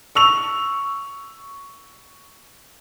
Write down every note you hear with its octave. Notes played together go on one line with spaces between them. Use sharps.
C#6 E6 F7